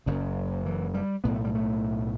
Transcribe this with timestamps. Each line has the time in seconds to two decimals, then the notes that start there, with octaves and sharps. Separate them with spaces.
0.06 F#1 F#2 C#3
0.66 E3
0.94 G3
1.24 B1 A2 B3
1.35 A3
1.45 G3
1.55 A3